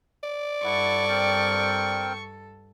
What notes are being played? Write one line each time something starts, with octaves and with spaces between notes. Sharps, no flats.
D5
G2 E4 A4 F#5 C#6
C4 A#4 G5